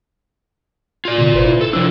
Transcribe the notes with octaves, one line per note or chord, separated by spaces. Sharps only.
F4 D5
B2 D3
G1 B4 C5
E4
A4
C3 F3 D4 E6